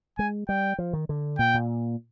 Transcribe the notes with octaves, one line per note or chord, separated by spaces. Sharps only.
G#3 G#5
G3 G5
F3
D#3
D3
A#2 G5
A#2